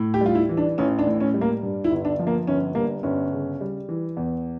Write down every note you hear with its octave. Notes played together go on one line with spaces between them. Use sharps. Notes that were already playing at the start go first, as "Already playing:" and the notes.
Already playing: A2
G4
G3 F4
E4
E3
D4
A1 C#4
D4
A2
C#4
G3
A#3
G2
E4
G1
D4
F3
A#3
G1 C#4
G2 A#3
G1 C#4
C#3
G3
E3
E2